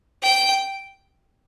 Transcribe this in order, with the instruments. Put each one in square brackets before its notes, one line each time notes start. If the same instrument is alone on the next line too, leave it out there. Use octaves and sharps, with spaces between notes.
[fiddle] G5